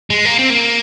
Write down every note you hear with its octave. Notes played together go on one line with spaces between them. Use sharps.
G#3
A#3
C4
A#3